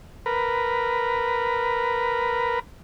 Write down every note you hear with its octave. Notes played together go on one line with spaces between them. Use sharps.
A#4 B4